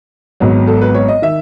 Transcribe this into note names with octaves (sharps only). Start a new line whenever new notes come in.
G#1 G#2 F#3 B3
A4
B4
C#5
D#5
D#3 E5